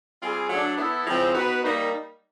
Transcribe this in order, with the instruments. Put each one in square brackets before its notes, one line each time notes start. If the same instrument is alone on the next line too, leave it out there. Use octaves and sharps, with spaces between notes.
[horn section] G3 C4 F4 G#4
F#3 A3 D4
B3 E4 A4
C#3 F3 G#3 C4 E4
B3 D#4 F#4 B4
G3 A#3 D#4